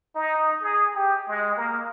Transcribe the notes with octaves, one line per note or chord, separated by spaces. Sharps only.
D#4
G#4
G4
G#3
A#3